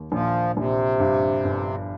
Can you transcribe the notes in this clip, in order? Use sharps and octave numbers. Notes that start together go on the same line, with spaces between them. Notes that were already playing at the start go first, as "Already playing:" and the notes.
Already playing: D#2
A#1 F3
A#1 C3
G2
G1